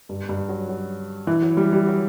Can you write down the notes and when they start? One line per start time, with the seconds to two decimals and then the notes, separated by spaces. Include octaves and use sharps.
0.09 G2
0.29 G2
0.49 F#3
0.69 F#3
1.27 E3
1.42 F#3
1.57 G3
1.72 G3
1.87 F#3